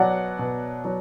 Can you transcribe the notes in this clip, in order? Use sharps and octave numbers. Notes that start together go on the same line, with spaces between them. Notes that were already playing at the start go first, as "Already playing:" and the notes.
Already playing: B2 F#3 D5 F#5
B2
F#3